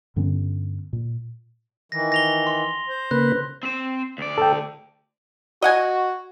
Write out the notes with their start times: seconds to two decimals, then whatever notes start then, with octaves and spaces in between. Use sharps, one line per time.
0.16 G2 D3 B3 C#4
0.93 A#2
1.92 D#3 E3 A#6
2.12 A#6 F7 G7
2.47 C6
2.89 C5
3.11 C#3 A#3 B4 F#6
3.63 C4 C5
4.18 D2 D5
4.38 A4 G5
5.62 F#4 D#5 F#5 G#5